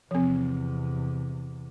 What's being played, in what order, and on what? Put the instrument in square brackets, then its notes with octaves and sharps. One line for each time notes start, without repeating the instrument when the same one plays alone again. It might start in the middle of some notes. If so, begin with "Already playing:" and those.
[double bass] E2 C3 [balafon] F3 C4